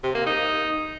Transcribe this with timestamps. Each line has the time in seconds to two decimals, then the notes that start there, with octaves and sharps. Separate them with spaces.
0.04 C3
0.15 A#3
0.27 D#4